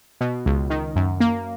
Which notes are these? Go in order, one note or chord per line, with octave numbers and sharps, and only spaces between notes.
B2
C#2
D#3
F#2
A#3